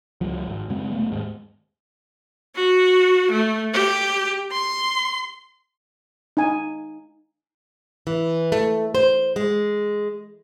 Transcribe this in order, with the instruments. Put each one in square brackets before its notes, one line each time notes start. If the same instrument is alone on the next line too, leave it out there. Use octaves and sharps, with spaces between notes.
[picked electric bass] C#2 F3 G3
G#1
F#2 C#3 G#3 C4
F1 F#2 A3 B3
D#2 G#2 G#3
[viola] F#4
A3
G4
C6
[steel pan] D#4 G#5
[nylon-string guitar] E3
A3
C5
G#3